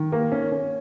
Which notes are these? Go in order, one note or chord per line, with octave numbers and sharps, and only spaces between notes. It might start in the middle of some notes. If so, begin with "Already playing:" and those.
Already playing: D#3
A#3
C#4
C#4